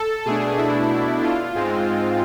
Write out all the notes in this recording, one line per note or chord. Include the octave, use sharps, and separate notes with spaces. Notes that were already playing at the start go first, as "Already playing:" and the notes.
Already playing: A4
B2 A3 D4 G#4
E4
F4
G#2 G#3 C4